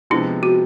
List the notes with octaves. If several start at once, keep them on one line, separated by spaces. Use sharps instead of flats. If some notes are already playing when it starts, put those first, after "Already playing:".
C3 F3 G#3 B3 D4 E4
F#4